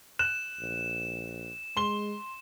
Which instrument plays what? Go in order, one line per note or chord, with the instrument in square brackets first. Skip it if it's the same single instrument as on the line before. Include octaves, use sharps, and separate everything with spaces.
[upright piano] F#6 [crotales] E7
[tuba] A#1
[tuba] G#3 [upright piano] C6 G7